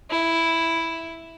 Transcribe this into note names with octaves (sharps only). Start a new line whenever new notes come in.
E4